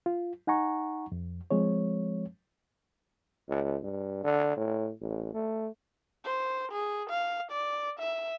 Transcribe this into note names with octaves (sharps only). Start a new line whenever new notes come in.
F4
D#4 F#5 G#5 A#5 C#6
F2
F3 G#3 C4 C#5
C#2
G2
D3
A2
A1
A3
C5
G#4
F5
D5
E5